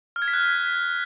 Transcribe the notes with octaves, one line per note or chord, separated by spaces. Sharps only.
F6
G#6
B6
F#6